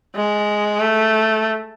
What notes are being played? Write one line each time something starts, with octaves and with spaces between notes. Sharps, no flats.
G#3
A3